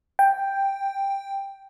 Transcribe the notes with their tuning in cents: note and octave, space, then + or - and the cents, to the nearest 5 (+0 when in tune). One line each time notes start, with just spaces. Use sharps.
G5 +5